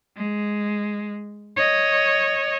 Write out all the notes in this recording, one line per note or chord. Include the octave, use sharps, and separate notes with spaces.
G#3
C#5 D#5